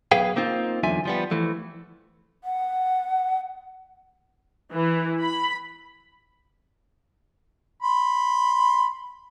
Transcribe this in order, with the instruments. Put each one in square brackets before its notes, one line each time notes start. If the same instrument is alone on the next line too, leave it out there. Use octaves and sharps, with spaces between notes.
[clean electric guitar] B1 G#4 B4 F5 G5
A#3 C4 D#4 F4
E2 D3 F#3 F4 E5 G#5
F3 G3 B3
E3 F3 A3
[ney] F#5
[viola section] E3
B5
[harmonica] B5 C6